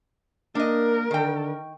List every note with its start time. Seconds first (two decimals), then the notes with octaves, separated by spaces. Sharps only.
0.55 A#3 D4 A#4 D#5
1.11 D3 D#3 G5